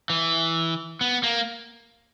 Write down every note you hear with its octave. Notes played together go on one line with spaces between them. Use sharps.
E3
B3
A#3